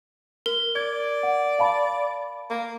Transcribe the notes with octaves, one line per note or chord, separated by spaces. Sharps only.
A#4
D5 G#6
F#5
F5 A5 B5
A#3